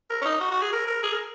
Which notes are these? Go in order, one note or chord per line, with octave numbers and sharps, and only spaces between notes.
A#4
C#4
D#4
F#4
F#4
G#4
A#4
A#4
G#4
A#4